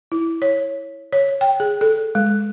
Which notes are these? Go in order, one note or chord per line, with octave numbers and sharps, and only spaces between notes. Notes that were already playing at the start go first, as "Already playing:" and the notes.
E4
C#5
C#5
G5
G#4
A4
G#3